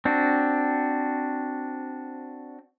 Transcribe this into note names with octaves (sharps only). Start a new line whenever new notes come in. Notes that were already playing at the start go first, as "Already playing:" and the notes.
C4 D4 F#4